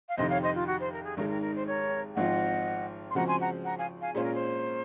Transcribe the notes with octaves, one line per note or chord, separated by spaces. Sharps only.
F5
F2 C3 D#3 C5 D#5
C#5 F5
C5 D#5
F4
F#4
C5
A#4
G#4
G#1 G#2 D#3 G#3 A#4
A#4
A#4
C5
A#4 C#5
G#1 G#2 F3 C4 F4 D#5 F#5
C6
C#3 F3 G#3 C4 F#4 F#5 A#5
G#5 C6
F#5 A#5
F#5 A#5
F5 G#5
F5 G#5
A#2 G#3 C#4 F4 C5
A#4
C5